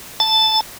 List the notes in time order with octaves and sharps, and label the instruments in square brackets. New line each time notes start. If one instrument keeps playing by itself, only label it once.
[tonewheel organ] A5